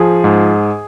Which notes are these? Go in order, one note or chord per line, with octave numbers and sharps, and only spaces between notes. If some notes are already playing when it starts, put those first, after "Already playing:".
Already playing: F3 G#4
G#2